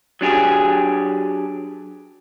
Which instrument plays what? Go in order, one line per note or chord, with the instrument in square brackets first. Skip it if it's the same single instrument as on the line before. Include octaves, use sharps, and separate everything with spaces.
[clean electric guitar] F#3 D4 G4 G#4